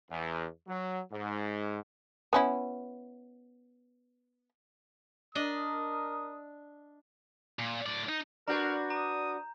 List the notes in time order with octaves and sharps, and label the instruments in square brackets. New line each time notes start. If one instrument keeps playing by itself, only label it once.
[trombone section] E2
F#3
G#2
[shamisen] B3 C#4 E4
[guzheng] D4 D#5 [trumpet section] A#4 D#6
[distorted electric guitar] A#2
A2 D5
D#4
[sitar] D4 F#4 B4 [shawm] A#4 [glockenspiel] A#5 G6
[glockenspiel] A#5 [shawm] D#6